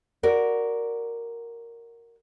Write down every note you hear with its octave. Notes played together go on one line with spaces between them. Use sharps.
F#4 A#4 D5